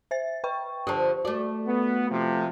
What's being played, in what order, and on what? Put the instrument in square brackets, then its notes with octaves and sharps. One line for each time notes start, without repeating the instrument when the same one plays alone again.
[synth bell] C5 E5 A6
B4 G5 C#6
[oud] D3 F3 [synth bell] G4 A5
[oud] A3 D5 [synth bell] F#4
[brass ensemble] B3
C3 F3